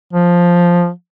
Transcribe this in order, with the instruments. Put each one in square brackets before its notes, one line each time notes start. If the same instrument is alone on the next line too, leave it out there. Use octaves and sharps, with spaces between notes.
[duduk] F3